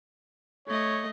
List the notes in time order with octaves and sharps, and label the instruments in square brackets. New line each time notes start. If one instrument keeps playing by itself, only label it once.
[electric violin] A3 D#5 [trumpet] C#5